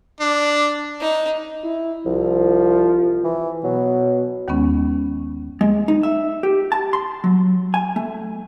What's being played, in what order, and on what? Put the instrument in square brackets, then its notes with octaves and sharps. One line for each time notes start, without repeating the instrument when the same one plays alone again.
[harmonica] D4
[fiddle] D#4
[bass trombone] E4
[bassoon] C2 [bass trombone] F3
[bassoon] E3
[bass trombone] B2 [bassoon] F#3
[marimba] D#2 D#3 G#3 B3 C#4
[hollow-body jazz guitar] G#3
D#4
E5
G4
A5
C6
F#3
G#5
A3